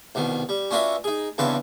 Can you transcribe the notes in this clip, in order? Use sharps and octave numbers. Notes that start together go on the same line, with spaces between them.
C2 B2 D#3
G3
C#4 D4 F4 F#4 B4 E5
D#4 G#4
E2 G2 C#3 C4 B4 A5